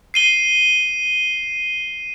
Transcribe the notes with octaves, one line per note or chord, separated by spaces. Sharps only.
C7 D#7 G7